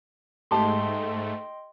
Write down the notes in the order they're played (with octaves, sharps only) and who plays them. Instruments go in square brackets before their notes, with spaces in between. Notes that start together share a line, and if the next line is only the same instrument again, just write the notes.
[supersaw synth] G#2 A3 [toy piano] G4 A4 A5 [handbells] D#5 G5 C6